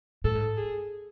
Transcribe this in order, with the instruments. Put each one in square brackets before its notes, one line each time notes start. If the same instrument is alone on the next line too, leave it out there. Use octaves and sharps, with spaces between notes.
[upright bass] A2 [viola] A4
[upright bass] G#2
[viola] G#4